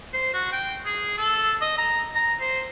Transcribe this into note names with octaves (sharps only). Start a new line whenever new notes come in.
C5
F#4
G5
G#4
A4
D#5
A#5
A#5
C5